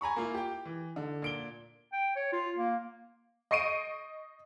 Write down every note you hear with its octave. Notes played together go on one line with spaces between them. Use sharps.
G#5 A#5 B5 C#6
A#3 E4 F4
G4 G5
E3
D3
A#2 D7 G7
G5
C#5
F4
A#3
D#5 C#6 C7 D7 D#7